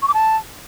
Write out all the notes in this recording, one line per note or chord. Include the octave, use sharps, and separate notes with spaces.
C#6
D6
A5